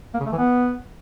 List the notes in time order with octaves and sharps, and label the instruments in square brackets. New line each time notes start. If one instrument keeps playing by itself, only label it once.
[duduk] A#3
C#3
A3
E3
B3